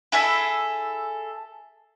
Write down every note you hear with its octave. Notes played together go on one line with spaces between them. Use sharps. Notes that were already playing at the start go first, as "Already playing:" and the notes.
E4 G#4 A4 E5